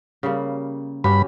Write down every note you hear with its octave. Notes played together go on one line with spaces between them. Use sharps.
C#3 G3 A#3
G2 C#4 F#4 G4 B5